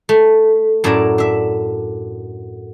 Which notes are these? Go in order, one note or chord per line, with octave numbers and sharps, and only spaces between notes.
A3
F#2 A2 E4 D5 A5 A#5
D4 E5